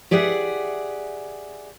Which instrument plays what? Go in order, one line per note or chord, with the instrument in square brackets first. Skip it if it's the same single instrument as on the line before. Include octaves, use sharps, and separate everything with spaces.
[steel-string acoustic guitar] G4 G#4 D5 E5 F#5